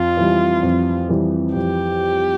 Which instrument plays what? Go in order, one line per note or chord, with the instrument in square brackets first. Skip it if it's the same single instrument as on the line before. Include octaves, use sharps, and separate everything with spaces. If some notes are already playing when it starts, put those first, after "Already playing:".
Already playing: [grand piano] F2 [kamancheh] F4
[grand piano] E3 G3
F2
E3 G3
[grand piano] F2 [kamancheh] G4